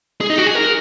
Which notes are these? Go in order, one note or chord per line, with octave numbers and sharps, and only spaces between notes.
G#4
D#4
F#4
G#4
A#4